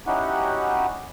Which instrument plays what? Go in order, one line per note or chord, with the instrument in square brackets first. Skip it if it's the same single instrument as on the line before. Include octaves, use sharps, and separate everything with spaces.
[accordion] C#4 D#4 E4 F#4 G4 F#5